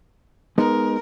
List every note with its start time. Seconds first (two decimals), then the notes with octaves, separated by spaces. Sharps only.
0.58 G#3 B3 D#4 A#4